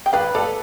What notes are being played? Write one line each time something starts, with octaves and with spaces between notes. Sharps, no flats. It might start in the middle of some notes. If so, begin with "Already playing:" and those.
G5
B4 D5 F5
A4 D5 F5